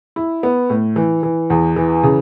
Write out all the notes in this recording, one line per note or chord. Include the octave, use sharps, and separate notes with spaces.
E4
B3
A2
E3
E3
E2
E3
C#3